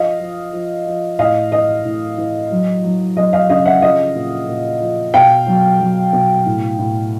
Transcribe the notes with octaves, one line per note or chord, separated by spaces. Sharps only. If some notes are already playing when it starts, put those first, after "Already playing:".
Already playing: F3 D#5 F5
F3
F3
F3
A2 D#5 F5
E3 D#5
A2
E3
F#3
F#3
F#3 D#5
D#5 F5
C#3 D#5 F5
E5 F#5
F3 D#5 F5
A#2
A#2
F3
B2 F5 G5
F#3
F#3
B2
A2
A2